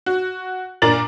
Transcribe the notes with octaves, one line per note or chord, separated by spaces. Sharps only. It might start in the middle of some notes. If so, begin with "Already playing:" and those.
F#4
A#2 D4 A#4 A#5 A6 F#7